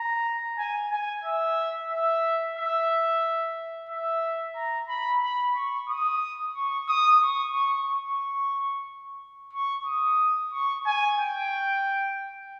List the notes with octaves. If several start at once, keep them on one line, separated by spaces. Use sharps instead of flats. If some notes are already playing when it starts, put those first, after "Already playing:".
Already playing: A#5
G#5
G#5
E5
E5
E5
E5
A#5
B5
B5
C#6
D#6
C#6
D#6
C#6
C#6
C#6
C#6
D#6
C#6
G#5
G5